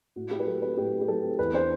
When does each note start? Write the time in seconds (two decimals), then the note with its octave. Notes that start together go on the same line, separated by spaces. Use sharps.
0.16 A2 F#4
0.31 E4 G4
0.39 B4
0.47 F#3 A4
0.62 C4 B4
0.77 A2 G4
0.93 E4
1.01 G4
1.08 F#3 A4
1.23 C4
1.39 E2 B4
1.54 D4 C5